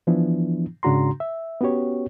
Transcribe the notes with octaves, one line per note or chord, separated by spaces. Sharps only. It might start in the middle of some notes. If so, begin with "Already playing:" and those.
E3 F3 B3 D4 E4
G#2 C#3 D4 F#4 A#5 C6
E5
B3 C#4 F#4 G4 C#5